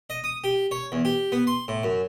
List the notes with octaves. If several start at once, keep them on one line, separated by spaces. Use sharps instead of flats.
D#5
D#6
G4
C#5
E2
G4
B3
C6
A2
F#2